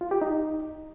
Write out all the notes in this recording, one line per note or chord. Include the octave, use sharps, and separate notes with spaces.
F4
G4
D#4